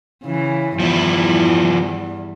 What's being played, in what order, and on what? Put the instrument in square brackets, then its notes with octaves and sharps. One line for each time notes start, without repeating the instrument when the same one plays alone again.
[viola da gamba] C#3 E3
[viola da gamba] E2 G2 [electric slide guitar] F3 E4